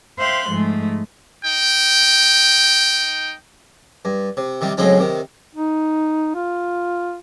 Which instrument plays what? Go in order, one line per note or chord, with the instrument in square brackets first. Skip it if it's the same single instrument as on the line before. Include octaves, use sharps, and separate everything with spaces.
[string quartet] C5 E5 F5 G5 C6 F#6
G#2 F3 G#3 A3
[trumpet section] D#4 G5
[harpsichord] G2
C3
C3 D#3 G3
A2 C#3 F#3 G#3 C4 D#4
C3 D#3
[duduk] D#4
F4